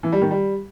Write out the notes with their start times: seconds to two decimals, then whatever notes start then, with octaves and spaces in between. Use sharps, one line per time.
0.03 E3
0.12 G3
0.22 D#3
0.31 G3